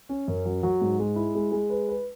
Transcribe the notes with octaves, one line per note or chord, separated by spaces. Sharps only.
C#4
F#2
F#3
F#3
G#2
G#3
E4
G#3
G#3
B4
B4